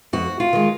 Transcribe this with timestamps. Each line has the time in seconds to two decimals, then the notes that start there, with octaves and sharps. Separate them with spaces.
0.13 F2 F#4
0.40 F4
0.53 D#3 G#3